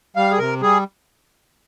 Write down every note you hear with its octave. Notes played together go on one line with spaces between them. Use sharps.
G3 F5
G#4
C3 A#4
G3 G#4